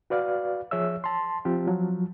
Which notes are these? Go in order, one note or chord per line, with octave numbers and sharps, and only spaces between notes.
F#4 B4 D5 F5
F3 G#4 C#5 E5 E6
A5 C6
F3 C4 F4 G4
F3 F#3